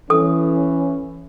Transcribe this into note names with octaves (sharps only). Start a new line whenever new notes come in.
E3 C#4 A4 D#6